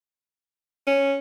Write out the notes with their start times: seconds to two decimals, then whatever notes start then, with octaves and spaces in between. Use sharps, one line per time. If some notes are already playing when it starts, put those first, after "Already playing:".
0.87 C#4